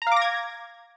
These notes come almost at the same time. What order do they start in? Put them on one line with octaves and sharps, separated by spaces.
A#5 F5 D6 A#6 G#6